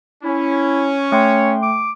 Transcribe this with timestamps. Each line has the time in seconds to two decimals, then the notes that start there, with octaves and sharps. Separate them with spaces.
0.24 C#4 E4
1.12 A3 C#5 G5 C6
1.62 D6